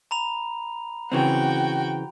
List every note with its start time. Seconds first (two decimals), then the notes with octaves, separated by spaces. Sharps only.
0.11 A#5 B5 F7
1.12 C#3 E3 C4 F#4 G5